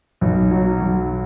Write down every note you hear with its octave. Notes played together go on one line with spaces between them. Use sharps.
B1
F#3
B1